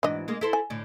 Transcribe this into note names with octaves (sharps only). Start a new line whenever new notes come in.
G#2 E3 D4 F#4 D#5
G#3 A#3
E4 A4 C5
G#5
A2 D3